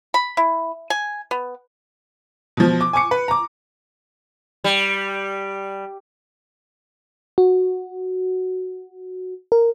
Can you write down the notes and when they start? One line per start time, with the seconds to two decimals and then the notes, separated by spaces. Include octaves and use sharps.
0.14 B5
0.37 E4
0.90 G#5
1.31 B3
2.57 B2 F3
2.81 D6
2.93 G#5 C#6 D6 C#7
3.11 B4
3.28 A#5 D6
4.64 G3
7.38 F#4
9.52 A#4